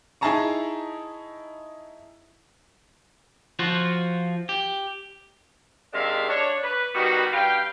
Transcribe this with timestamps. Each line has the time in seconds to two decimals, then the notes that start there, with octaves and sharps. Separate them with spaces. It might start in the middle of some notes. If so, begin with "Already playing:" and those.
0.21 D#4 E4 G#4 A5 A#5 C#6
3.59 F3 F4 F#4
4.49 G4
5.93 C3 D#3 G#3 D4 E5 F5
6.28 D4 C#5
6.63 B4
6.94 D#3 G3 B3 F#4
7.33 G2 B4 F5 G5